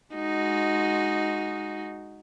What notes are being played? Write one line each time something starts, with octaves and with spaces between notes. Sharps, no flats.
G#3 D#4 F#4